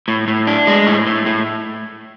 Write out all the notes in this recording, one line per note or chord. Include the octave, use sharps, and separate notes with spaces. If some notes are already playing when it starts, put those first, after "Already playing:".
A2
A2
D4
G#3
A2
A2
A2